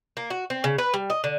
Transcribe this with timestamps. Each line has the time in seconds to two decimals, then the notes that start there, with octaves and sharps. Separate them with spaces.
0.17 A#3
0.30 F#4
0.50 C4
0.64 C#3
0.78 B4
0.94 G3
1.10 D#5
1.24 D3